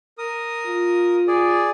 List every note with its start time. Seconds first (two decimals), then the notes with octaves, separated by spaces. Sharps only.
0.18 A#4 D#6
0.67 F4
1.28 G#4 D5